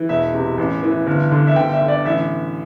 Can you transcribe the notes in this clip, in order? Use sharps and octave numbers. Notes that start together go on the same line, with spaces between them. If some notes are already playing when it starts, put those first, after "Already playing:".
Already playing: E3
E1 E5
C3
A1
E3
G1
D3
E5
G1 G5
E5
D3
D5
A1 E5